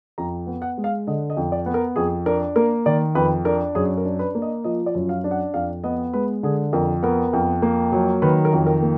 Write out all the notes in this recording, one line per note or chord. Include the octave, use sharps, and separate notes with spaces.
F2 A#5
B3
F#5
G#3
F5
D3 D#5
D#5
F2
D5
B3
A#4
F2 G#4
D4 A#4
A#3 A#4
D#3 D5
F2 B4
D4 A#4
F#2 G#4
A#4
D4
B4
A#3
D#5
F3 D#5
D5
F#2
F5
D4
F#5
F2 F5
B3 D#5
G#3 B4
D3 G#4
F2 A#4
B3 A#4
F2
A#3
F#3
D#3 B4
A#4
F2
A#4
A#3